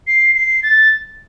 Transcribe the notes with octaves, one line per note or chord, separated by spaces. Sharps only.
C7
C7
A6